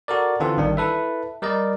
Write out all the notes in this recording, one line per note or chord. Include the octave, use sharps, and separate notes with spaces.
F#4 A4 A#4 D5
D3 E3 C4 F4 G4 A4
A1 D#3 G3 D4
E4 A4 B4 E5
G3 A#4 D5 D#5